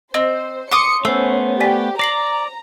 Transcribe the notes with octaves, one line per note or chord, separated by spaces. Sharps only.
C4 C5 D#5
C6 D6 D#6 C#7
A3 B3 C#4 C5 E6
G4 D5 G#5 B6
D5 A#5 A#6 C7 F#7